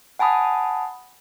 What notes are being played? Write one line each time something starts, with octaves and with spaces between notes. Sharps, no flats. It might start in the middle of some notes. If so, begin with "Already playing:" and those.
F#5 G#5 A5 B5 D#6